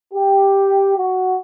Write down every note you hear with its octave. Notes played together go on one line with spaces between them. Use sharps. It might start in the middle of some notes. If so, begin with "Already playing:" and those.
G4
F#4